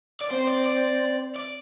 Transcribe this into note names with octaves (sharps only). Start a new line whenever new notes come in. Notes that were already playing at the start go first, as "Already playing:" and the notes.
D5
C4 C5
D5
D5
D5